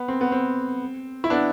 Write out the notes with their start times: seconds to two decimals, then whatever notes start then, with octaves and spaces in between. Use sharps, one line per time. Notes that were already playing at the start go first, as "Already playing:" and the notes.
Already playing: B3
0.08 C4
0.21 B3
0.32 C4
1.24 E4
1.30 B3 D4